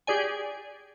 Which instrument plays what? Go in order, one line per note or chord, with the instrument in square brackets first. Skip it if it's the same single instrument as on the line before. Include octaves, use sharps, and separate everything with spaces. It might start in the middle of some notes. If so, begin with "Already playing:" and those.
[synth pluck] G4 G#4 D5 G#5